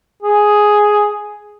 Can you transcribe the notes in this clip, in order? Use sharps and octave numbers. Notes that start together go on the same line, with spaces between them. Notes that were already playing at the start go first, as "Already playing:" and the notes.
G#4